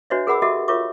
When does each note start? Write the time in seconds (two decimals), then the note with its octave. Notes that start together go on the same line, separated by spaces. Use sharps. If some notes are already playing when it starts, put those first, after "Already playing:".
0.10 D4 F#4 B4 C#5 D#5 E5
0.27 G#4 A#4 F#5 B5 D6 E6
0.42 F#4 G4 A4 D#5 E5 D6
0.68 F4 A#4 C#5 E5 C#6 D6